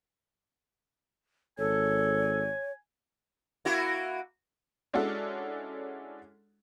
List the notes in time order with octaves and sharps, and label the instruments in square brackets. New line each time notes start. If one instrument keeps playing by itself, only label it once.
[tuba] G#1 [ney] A4 [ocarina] C#5 [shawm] G#5
[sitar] A#3 E4 F#4
[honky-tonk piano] G#3 C#4 D4 E4 F#4 A4